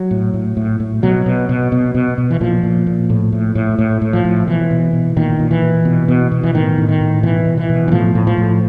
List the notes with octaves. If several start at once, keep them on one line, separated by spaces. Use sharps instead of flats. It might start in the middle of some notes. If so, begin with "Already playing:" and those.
Already playing: F#3
A2
A2
A2
A2
B2 F#3
B2
B2
B2
B2
B2
E3
A#2 F3
A#2
A#2
A2
A2
A2
A2
A2
F3
A2
B2 E3
B2
B2
A#2 D#3
A#2
E3
A#2
B2
B2
B2
E3
A2 D#3
A2
D#3
A2
B2 E3
B2
E3
B2
E3
A2 F3
A2
F3
A2